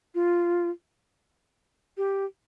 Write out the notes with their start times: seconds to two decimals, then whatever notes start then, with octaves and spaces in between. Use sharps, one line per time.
0.15 F4
1.97 G4